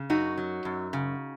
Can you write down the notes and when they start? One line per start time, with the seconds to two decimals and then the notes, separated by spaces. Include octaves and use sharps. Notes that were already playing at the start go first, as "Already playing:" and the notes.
Already playing: C#3
0.10 F#2 D#4 F#4
0.37 F#3
0.65 F#2
0.93 C#3